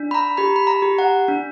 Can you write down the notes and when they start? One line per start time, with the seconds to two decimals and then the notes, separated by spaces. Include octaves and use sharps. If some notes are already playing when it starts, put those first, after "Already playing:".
Already playing: D4
0.11 B5
0.14 A#5
0.37 G4 B5
0.56 B5
0.67 A#5
0.82 G4
0.99 F#5
1.28 D4